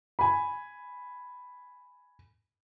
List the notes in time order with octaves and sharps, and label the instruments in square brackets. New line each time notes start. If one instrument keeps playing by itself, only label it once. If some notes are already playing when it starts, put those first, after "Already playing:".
[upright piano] G#5 B5